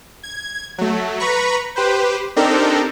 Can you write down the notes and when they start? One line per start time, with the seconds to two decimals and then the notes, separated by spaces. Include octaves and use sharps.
0.23 G#6
0.78 F#3 A3
1.20 B4 A#5 B5 C#6
1.76 G4 B4 C5
2.36 C4 D4 D#4 G4 A4 A#4